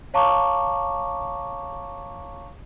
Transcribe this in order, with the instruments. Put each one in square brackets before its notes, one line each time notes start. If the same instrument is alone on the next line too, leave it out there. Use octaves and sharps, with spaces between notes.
[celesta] C#5 F5 A5 A#5 C#6 D6